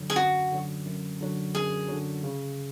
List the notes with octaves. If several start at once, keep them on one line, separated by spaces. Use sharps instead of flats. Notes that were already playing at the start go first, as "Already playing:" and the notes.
Already playing: F#2 D3 F#3
G#4
F#2 F#4
D3 F#3
F#2
D3 F#3
F#2 G#4
D3 F#3
C#3